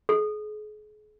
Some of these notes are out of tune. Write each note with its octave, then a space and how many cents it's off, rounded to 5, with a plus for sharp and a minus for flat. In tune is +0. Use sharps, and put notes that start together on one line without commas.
G#4 +35